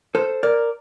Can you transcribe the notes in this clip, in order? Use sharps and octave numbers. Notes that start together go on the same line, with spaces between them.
A4 C5
A#4 D5